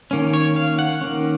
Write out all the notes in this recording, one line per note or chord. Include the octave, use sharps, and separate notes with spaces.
D#3 A#3 C#4
C#5
F5
F#5
D#3 A#3 C#4